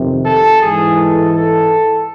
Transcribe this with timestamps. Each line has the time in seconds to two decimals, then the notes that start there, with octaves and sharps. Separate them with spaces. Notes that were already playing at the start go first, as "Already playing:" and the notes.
Already playing: F2 C3 D#3
0.26 A4
0.61 G#2 E3 G#4
0.97 A4
1.31 A4